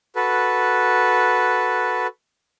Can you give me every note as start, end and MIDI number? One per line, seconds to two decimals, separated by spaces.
0.16 2.07 66
0.16 2.07 69
0.16 2.07 71